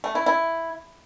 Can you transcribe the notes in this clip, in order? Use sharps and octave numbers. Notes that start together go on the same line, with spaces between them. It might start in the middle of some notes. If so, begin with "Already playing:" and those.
A3
E4
E4